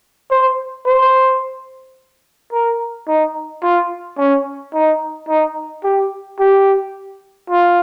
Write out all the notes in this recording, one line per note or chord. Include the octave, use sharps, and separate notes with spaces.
C5
C5
A#4
D#4
F4
C#4
D#4
D#4
G4
G4
F4